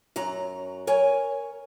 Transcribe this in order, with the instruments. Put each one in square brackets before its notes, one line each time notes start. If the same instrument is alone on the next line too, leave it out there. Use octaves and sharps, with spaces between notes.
[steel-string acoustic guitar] F#2 F#3 A#5
A#4 C#5 G#5